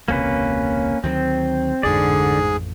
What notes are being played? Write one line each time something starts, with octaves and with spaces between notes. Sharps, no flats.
E1 C#2 C3 A#3 C#4 B4
D2 D#3 F#3 C4
A1 F2 G#2 D3 G#4 D5